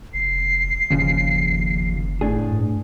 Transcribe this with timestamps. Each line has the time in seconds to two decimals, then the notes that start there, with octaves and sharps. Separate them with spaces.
0.14 F1 C7
0.91 F#1 D#2 C#3 F3
2.21 A2 D4 G#4
2.49 G2